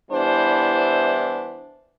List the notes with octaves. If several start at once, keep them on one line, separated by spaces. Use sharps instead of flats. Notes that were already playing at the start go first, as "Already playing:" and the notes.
E3 G3 B3 D4 E4 C5